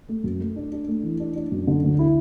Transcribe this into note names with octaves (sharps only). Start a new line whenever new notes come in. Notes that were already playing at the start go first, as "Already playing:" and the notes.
A3
F#2
A3
D4
D4
A3
E3
D4
D4
F#2
D3
D2
E4